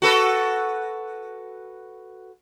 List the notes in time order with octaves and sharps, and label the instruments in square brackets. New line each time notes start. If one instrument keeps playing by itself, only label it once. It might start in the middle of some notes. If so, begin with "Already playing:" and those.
[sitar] F#4 A4 B4